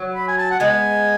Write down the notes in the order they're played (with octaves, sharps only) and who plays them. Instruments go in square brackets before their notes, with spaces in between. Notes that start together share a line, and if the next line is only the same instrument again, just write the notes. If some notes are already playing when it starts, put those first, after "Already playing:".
Already playing: [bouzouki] F#3
[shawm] B5
G#5
A5
F#5
[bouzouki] G#3 B3 [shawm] G#5